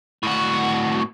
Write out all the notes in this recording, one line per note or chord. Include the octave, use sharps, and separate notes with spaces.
A2 F#4